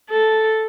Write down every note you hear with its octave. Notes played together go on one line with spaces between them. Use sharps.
A4